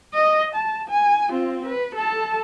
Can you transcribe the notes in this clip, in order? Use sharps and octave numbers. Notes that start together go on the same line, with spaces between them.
D#5
A5
G#5
C4 F4
B4
A4 A5